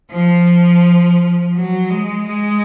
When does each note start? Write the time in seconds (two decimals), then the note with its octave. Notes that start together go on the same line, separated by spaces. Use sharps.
0.10 F3
1.55 F#3
1.90 G#3
2.27 G#3